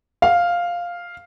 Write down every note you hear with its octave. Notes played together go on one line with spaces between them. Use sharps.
F5